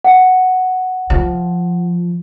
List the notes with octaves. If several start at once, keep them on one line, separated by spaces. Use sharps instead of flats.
F#5
F3